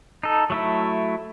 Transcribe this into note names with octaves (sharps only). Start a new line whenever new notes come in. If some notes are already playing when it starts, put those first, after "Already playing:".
D#4 A4
F#3 A3 E4